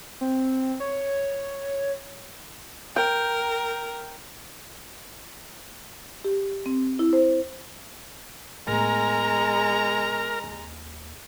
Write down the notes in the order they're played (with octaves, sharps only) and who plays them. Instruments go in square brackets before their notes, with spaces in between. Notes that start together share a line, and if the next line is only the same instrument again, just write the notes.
[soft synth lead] C4
C#5
[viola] A#4 [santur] G5
[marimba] G4
C4
E4
C5
[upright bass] A2 B3 [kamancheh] G#3 A#5 [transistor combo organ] A#4
[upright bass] D#2